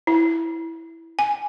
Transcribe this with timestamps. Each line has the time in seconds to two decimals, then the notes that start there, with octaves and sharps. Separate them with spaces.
0.07 E4
1.19 G#5